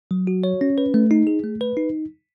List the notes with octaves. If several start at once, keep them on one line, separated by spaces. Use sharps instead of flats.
F#3
F#4
C#5
C#4
B4
A3
D#4
G#4
A3
B4
D#4